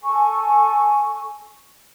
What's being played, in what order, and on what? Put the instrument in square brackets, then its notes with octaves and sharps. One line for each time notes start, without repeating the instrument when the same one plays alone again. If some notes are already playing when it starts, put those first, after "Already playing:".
[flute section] A4 G#5 C#6